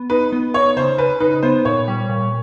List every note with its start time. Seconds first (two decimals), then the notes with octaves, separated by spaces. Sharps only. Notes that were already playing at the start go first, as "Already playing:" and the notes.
Already playing: B3
0.10 D#4 B4
0.32 B3
0.54 D#4 C#5
0.76 C#3 C5
0.98 C#3 B4
1.20 D#4 B4
1.43 B3 C5
1.65 A#2 C#5
1.88 G3
2.09 A#2